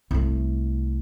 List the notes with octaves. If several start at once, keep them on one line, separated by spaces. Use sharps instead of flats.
C2 A3